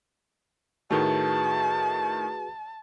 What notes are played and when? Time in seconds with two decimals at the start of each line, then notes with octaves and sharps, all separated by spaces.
0.91 A2 D#3 A3 F#4 G#4 B4 A5